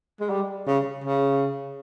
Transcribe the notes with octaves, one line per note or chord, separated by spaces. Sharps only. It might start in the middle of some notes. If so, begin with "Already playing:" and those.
G#3
G3
C#3
C#3